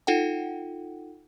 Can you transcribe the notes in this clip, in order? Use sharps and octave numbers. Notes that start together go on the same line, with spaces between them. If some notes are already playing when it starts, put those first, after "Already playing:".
D#4 F4 A4 F#5 G5